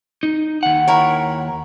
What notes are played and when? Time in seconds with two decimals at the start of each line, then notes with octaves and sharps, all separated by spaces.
0.23 D#4
0.63 D#2 F#5
0.87 E4 A#4 C#5